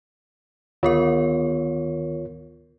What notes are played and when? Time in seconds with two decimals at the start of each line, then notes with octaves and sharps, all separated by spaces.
0.83 D2 D#3 B3 F4 A#4 C#5